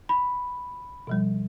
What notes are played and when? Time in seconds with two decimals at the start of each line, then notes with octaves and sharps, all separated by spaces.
0.09 B5
1.07 B2 F3 G3